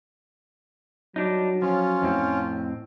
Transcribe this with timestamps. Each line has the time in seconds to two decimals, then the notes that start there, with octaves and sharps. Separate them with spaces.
1.16 F#3 G3 D4 D#4
1.62 F3 C#4 F4
2.02 F2 A2 C4